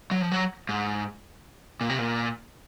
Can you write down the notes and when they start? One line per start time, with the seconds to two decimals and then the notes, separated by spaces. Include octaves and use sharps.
0.11 F#3
0.21 F3
0.32 F#3
0.69 G#2
1.81 A#2
1.89 C3
1.99 A#2